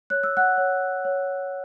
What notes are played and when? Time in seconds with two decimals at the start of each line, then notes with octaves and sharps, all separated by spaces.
0.10 C#5 F#6
0.23 E6
0.37 F#5 F#6
0.58 C#5
1.05 C#5